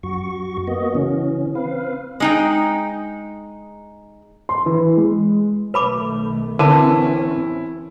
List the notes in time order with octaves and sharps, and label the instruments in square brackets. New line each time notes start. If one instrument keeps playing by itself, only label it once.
[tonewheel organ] F#2 F#4 C#6
A#3 B3 F#4 D#5
C#3 E3 C#4
C4 B4 F5
[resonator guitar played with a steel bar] G#3 D#4 G5
[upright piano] C6
E3
G#3
[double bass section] B1 D#3 A3 [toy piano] B4 B5 D6
[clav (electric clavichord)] D3 [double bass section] E3 C4 C#4 [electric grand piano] E4 [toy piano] A#4 B4 A5